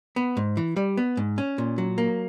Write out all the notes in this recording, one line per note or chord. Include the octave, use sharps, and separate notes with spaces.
B3
G#2
E3
G3
B3
G#2
C#4
A#2
F#3
A#3